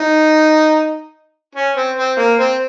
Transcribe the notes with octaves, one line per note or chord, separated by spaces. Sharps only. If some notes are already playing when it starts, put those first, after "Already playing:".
Already playing: D#4
C#4
C4
C4
A#3
C4